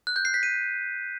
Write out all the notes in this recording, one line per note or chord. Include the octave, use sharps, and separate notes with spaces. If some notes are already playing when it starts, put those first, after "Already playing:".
F#6
G6
C7
B6
D#7